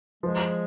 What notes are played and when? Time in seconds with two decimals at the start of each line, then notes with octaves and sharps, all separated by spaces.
0.23 F3 G#3